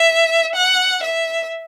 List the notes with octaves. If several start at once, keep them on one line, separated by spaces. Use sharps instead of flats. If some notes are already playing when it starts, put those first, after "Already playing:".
Already playing: E5
F#5
E5